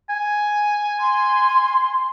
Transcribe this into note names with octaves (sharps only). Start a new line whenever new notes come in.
G#5
C6